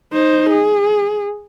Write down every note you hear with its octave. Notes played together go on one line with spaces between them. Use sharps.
D#4 C5
G#4